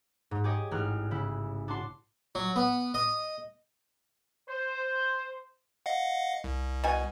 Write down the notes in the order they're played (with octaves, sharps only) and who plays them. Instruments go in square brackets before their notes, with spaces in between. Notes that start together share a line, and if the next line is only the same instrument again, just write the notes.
[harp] G#2
G4 G#4 C#5 D#5
A1 G#2 F6 F#6
C#3 E4
D4 F#4 A5 C6
[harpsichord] F#3
B3
D#5
[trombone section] C5
[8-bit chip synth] D#5 F5 F#5
C2
[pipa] B2 G#5